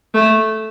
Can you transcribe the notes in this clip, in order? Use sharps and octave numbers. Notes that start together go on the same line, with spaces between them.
A3